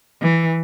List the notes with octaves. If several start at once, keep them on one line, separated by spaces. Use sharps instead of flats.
E3